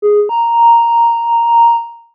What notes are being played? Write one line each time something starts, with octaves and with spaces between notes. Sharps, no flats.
G#4
A#5